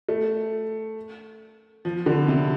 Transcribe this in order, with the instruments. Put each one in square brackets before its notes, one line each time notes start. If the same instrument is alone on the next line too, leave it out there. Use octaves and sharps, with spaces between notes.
[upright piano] A3
F3
D3
C3